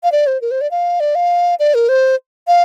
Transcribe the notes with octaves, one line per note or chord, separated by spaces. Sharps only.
F5
D5
C5
A#4
C5
D5
F5
D5
F5
D5
A#4
C5
F5